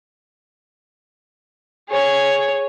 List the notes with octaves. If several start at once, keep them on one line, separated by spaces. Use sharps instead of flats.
G#4 C#5